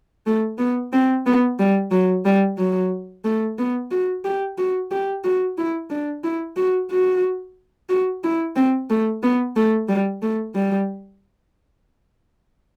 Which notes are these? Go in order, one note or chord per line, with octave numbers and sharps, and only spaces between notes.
A3
B3
C4
B3
G3
F#3
G3
F#3
A3
B3
F#4
G4
F#4
G4
F#4
E4
D4
E4
F#4
F#4
F#4
E4
C4
A3
B3
A3
G3
A3
G3